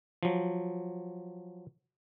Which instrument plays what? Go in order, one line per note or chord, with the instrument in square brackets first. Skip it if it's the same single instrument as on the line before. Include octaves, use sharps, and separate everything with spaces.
[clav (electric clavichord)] F3 F#3